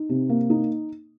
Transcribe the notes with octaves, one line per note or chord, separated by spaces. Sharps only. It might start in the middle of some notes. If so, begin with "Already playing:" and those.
Already playing: D#4
C3
A#3
D#4